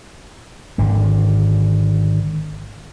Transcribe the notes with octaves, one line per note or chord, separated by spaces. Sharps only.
G#1 D3